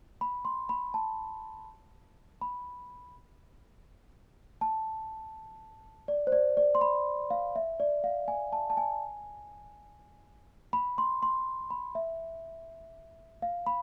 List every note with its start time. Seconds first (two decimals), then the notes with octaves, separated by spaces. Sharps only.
0.21 B5
0.45 C6
0.69 B5
0.94 A5
2.41 B5
4.61 A5
6.08 D5
6.27 C5
6.32 D5
6.57 D5
6.75 C6
6.81 B5
7.30 F5
7.56 E5
7.80 D5
8.04 F5
8.28 G#5
8.53 A5
8.70 A5
8.77 G#5
10.73 B5
10.98 C6
11.23 C6
11.70 B5
11.95 E5
13.42 F5
13.67 B5